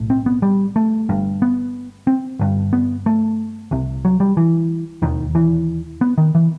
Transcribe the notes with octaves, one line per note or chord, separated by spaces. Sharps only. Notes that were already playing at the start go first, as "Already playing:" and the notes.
Already playing: B1 A2
C4
B3
G3
A3
G1 G2
B3
C4
G1 G2
B3
A3
C2 C3
F#3
G3
E3
E1 D#2 D#3
E3
B3
D#3
E3